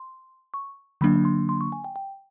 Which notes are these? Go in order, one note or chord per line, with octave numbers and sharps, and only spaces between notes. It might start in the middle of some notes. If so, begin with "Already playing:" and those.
Already playing: C6
C#6
D3 F#3 A#3 D4 B5
C6
C6
C#6
G#5
G5
G5